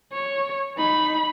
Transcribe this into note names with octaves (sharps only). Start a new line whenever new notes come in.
C#5
D#4 B5